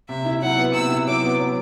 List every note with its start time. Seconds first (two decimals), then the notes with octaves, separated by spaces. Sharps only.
0.09 C3 E5
0.25 E4
0.41 F#3 F#5
0.58 B3
0.74 C3 E6
0.90 E4
1.07 F#3 D6
1.23 B3
1.39 F#3